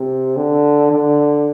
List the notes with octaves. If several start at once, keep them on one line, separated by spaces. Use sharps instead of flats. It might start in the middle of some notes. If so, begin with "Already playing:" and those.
Already playing: C3
D3
D3